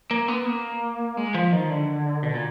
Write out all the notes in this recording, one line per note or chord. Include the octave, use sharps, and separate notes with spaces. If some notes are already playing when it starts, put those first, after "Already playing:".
A#3
B3
A#3
G#3
F3
D#3
D3
B2
A#2